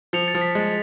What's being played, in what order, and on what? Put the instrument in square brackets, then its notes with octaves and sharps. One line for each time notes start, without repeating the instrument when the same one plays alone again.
[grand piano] F3 [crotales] C#7 F7
[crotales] A6 C#7
[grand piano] F3
[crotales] B6
[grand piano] G#3